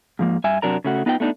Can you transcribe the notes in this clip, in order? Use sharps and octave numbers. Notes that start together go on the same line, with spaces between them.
G#2 F3 A#3
G2 E5 G#5
F#2 C3 F#3 D4 A#4 A#5
C#3 A3 F#4
B3 D#4 F4 B4 G5
A3 B3 D4 D#4